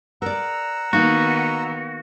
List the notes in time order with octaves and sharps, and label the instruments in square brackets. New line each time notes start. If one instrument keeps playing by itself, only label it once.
[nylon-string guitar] A#4 D5 [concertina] F#5 A#5 E6
[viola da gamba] D#3 B3 [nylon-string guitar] A#3 D#4 [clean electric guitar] F#4